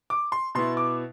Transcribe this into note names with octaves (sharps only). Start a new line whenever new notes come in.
D6
C6
B2 B3 E4 C6
D6